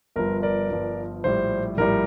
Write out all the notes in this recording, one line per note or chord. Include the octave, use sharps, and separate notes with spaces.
G1 G2 F3 A#4
A#4 D5
G1 G2 F3
A#1 A2 G3 C5
A#1 A2 G3 A#4